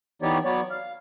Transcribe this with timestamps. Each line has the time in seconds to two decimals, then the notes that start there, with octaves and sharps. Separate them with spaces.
0.22 E3 B3 D#4 G4 C#5 D5
0.45 F#3 B3 C#5 D5
0.70 F5